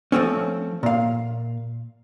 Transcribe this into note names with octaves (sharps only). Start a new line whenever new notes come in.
F3 A3 C4 C#4
A#2 F5